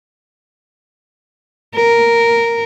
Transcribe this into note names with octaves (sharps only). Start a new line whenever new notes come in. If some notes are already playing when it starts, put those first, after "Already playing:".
A#4